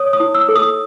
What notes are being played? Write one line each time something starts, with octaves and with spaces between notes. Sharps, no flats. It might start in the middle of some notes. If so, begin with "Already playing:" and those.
Already playing: C#5 D#6
D#6
E4
E6
A4
D#6